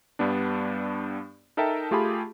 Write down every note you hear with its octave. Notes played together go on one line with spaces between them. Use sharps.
G2 G3 B3 D4
D#4 A4 A#4 E5 G5 A5
A3 F4 G4 G#4 A5 B5